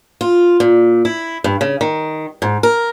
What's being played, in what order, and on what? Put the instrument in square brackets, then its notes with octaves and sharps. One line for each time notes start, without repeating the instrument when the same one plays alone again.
[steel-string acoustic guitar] F4
A#2
E4
G2
C#3
D#3
G#2
A#4